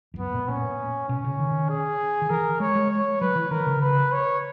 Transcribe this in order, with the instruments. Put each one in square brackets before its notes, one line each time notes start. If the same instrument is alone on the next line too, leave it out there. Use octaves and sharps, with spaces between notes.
[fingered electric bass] E2
[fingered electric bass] F#2 [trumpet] B3
[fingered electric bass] A#2
[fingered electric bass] A#2 [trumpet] C#4
[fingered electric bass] B2 [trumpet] C#4
[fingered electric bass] C#3
D#3
[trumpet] G#4
[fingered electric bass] D#3
[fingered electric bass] E3 [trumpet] A#4
[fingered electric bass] G#3 [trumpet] C#5
[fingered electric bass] G#3
[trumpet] C#5
[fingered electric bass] F#3 [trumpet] B4
[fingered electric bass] E3
[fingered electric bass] D#3 [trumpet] A#4
[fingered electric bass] C#3
[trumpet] B4
C#5